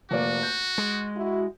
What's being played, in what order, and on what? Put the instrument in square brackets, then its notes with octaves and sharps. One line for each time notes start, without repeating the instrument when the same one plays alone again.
[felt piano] F1 A#3 D5 [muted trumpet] F#4
[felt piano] G6
[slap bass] G#3
[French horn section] E4 F#4